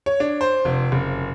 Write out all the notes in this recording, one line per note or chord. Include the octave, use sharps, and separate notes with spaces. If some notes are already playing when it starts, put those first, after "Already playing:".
C#5
D4
C5
F1
F#1